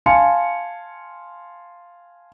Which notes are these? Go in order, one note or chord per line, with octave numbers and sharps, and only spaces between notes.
F5 G#5 A5 C6 C#7